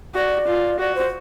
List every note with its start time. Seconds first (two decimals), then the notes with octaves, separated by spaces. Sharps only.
0.15 F#4 D5
0.48 F4
0.79 F#4 D5
0.95 C5